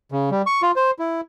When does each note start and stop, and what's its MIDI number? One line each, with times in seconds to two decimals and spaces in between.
0.12 0.30 49
0.31 0.42 55
0.46 0.62 85
0.62 0.71 65
0.76 0.91 72
0.99 1.21 64